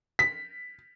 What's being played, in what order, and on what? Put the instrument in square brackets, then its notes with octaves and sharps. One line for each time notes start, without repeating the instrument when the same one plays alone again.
[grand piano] B6